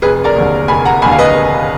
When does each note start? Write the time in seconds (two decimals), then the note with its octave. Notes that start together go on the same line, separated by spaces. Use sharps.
0.02 F1 G#4 B4
0.24 A#4 D5
0.36 D#2 D3
0.68 F1 G#5 B5
0.85 F#5 A#5
1.02 D#2 G#5 B5
1.05 D3
1.11 F5
1.18 B4 D#5